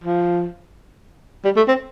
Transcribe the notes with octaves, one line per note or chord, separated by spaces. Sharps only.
F3
G3
A3
C4